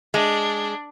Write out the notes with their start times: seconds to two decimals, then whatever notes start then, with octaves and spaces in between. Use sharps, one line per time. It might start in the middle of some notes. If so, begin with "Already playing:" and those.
0.14 G#3 D4